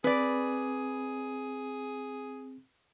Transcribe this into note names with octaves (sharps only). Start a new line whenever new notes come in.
C4 G#4 B4 D5